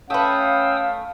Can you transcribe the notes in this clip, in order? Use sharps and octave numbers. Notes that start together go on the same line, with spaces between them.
A3 C#4 B4 F5 G5 D#6 E6